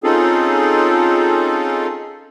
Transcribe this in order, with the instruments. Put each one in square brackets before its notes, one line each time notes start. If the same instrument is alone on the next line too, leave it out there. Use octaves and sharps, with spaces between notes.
[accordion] C4 C#4 D#4 F4 G#4 A4